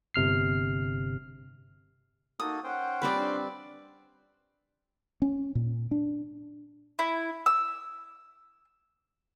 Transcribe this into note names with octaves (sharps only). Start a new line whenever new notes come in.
G1 C3 F6 C7
A#3 D#4 F#4 A4 D#6
C#4 C5 F#5 G5
G3 C4 F4 B4 D5
D4
C#4
A#2
D4
E4
E6